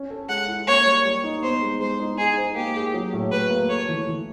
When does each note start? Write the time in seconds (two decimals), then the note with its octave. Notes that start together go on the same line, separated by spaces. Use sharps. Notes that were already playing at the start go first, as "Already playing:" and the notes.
Already playing: C#4
0.10 A4
0.29 G#3 F#5
0.48 E4
0.67 A#3 C#5
0.85 G3
1.05 G3
1.24 D#4
1.43 B3 C5
1.61 G#3
1.80 G#3 C5
2.00 D#4
2.18 D#4 G#4
2.37 C5
2.55 A#3 G4
2.75 G#4
2.94 F#3
3.13 A2
3.31 A2 B4
3.50 A#3
3.69 A3 C#5
3.89 E3
4.07 E3